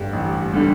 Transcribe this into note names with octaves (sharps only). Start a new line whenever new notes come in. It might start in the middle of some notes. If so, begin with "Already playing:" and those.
Already playing: A1 G2 D3 G3
A1
D3 G3